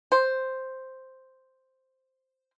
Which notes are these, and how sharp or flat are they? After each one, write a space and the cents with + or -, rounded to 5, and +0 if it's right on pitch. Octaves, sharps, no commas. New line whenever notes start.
C5 +0